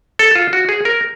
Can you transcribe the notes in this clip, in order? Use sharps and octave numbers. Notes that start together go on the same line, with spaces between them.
A4
F4
F#4
G#4
A#4